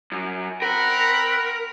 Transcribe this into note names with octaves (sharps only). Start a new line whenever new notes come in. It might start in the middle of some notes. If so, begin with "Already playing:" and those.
F#2
C4 A#4 F#5 B5